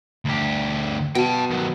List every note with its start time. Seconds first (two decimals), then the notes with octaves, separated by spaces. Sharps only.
0.25 D2 G4
1.15 B2 G5 A5
1.51 D#3 F#3